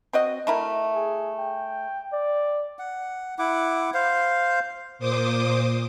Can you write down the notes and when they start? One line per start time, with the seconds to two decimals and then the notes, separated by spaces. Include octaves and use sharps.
0.13 C4 F#4 D#5
0.47 A3 E4 A#4
0.95 G#4
1.39 G5
2.13 D5
2.79 F#5
3.39 E4 F#5 D6
3.94 C5 F5
4.99 A#2 C5 D6 D#6